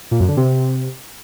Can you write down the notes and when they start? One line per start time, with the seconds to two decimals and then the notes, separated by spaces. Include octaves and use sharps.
0.11 A#2
0.20 F#2
0.28 D3
0.37 C3